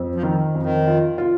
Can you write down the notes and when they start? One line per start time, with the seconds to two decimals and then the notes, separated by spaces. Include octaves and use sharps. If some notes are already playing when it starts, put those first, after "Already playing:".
Already playing: F2
0.15 F3
0.23 D#3
0.55 F2
0.63 D#3
0.87 F4
1.18 F4